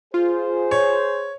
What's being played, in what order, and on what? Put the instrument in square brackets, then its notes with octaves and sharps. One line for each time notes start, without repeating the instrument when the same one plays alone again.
[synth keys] F4 [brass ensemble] G#4 C5
[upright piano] C#5